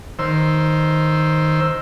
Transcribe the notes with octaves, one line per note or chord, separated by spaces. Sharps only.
D#3 C5 E6